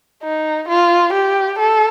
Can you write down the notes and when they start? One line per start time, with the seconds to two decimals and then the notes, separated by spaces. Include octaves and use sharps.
0.23 D#4
0.69 F4
1.13 G4
1.59 A4